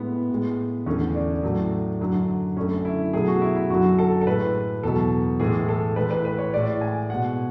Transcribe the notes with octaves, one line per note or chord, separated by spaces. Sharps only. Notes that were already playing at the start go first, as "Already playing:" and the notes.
Already playing: A2 G#3 B3
A2 G#3
E2 D3 A3 C#4
D4
A2 F#3 A3
F#2 D3 F#3
F#2 D3 A3 C#4
E4
B2 F#3 A3 G#4
F#4
E4
E4
F#2 D3 F#3 F#4
A4
A4
A2 G#3 B4
E2 B2 F#3 A4
A2 E3 G#3 G#4
A4
A2 E3 G#3 B4
B4
B4
C#5
A2 G#3 D5
G#5
B2 G#3 F#5